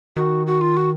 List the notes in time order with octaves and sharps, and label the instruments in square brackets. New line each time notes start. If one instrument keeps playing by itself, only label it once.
[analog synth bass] D#3 [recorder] F#4
[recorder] F#4
F4
F#4